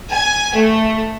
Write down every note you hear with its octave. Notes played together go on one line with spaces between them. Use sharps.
G#5
A3